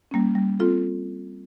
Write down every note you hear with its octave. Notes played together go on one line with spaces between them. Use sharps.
G3 A#3 C#4
G3
C4 F4 A4